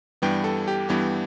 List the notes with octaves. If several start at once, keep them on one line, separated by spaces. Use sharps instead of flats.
G2 E3 G3 B3 G5
A4
G4
G2 E3 G3 B3 G4